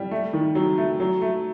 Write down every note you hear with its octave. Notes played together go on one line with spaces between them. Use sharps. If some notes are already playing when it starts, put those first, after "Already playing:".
Already playing: G3
A3
D#3
F#3
A3
F#3
A3